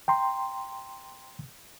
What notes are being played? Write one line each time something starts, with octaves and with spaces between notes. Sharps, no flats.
G5 A#5 C6